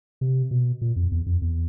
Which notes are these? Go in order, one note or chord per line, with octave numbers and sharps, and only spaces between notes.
C3
B2
A#2
F2
E2
F2
E2